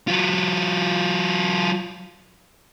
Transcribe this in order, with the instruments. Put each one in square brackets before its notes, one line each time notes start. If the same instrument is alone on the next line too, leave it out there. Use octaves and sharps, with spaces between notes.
[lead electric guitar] F#3 F4